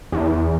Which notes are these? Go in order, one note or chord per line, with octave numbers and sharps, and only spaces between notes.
E2